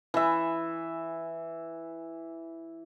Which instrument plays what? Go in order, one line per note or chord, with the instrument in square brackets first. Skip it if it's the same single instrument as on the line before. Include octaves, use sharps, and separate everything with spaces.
[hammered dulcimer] E3 E5